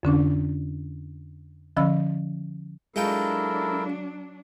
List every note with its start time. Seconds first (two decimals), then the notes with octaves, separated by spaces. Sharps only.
0.03 F2 D3 C#4 D4
1.77 D3 F3 C#4 D#5 B5 E6
2.96 F#3 G#3 D4 E4 F4 A4 A#4 G5